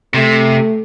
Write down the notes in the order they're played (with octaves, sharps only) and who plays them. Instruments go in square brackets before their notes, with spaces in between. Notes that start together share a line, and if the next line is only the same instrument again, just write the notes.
[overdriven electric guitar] C3 [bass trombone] A3